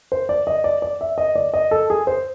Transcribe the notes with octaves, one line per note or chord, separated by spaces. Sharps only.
C5
D5
D#5
D5
D5
E5
D#5
D5
D#5
A4
G#4
C5